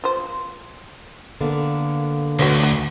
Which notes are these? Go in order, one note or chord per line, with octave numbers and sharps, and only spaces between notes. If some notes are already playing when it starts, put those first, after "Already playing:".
F4 C5
D3 A#3 B3
D2 F#4 B4 C#5
F#4